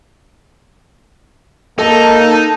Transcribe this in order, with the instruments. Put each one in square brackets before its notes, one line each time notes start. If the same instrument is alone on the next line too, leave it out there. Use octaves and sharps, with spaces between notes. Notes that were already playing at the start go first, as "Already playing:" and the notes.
[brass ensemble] A#3 [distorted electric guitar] D#4 [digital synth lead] A4 [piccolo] A5